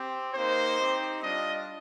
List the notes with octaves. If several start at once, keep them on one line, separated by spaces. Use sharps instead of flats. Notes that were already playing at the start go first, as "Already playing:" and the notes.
Already playing: C4 G4
A#3 D#4 G4 C5
C4 D#4 G4
G3 D4 F4 D#5